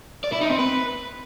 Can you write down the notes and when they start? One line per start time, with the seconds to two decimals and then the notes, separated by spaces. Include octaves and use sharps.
0.24 D5
0.33 E4
0.41 D#4
0.50 C4
0.58 B4